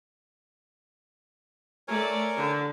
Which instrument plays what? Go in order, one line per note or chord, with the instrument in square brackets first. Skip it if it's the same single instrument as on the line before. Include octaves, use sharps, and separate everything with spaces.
[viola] A3 D5 [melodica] A#4 C#5 G#5
[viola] D3